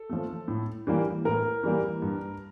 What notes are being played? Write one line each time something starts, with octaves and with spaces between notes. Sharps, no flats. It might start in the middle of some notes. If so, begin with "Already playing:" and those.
Already playing: A4
F3 A3
A2
E3 G3 A#3
A2 A#4
E3 G3 A#3
G2